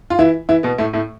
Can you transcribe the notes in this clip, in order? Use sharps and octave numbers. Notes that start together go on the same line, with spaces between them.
F4
E3 E4
E3 E4
B2 B3
A2 A3
A2 A3